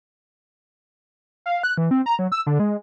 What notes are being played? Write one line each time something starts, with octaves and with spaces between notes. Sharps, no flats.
F5
F#6
E3
C4
A#5
F#3
E6
D3
G#3